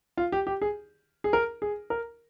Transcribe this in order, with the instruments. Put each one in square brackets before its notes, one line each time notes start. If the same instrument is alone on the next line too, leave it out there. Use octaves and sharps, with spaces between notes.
[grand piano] F4
G4
G4
G#4
G#4
A#4
G#4
A#4